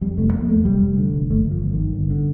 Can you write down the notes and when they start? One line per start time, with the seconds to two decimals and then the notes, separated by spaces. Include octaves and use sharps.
0.01 F2 G3
0.17 F1 A3
0.33 F2 A#3
0.49 F2 A3
0.65 F1 G3
0.82 F1
0.98 D3
1.14 F1
1.30 G1 A3
1.45 G1
1.51 F3
1.62 G1
1.73 G1 D#3
1.95 G1
2.10 D3